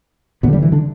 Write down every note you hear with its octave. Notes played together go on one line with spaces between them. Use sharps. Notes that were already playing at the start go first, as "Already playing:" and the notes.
D2 B2 B3
D3
G2 G3
E3
D3 D4